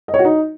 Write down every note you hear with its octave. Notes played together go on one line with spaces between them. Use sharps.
D#5
C#5
F#4
D#4